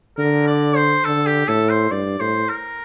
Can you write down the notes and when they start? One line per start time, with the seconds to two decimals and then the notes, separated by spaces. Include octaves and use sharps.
0.18 D3 A#4
0.47 D5
0.76 C5
1.05 D3 A4
1.26 G4
1.48 A2 A4
1.70 C5
1.91 G2 D5
2.20 A2 C5
2.49 A#4